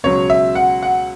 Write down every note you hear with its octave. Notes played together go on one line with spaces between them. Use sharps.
C#2 B2 F#3 C#5
E5
F#5
F#5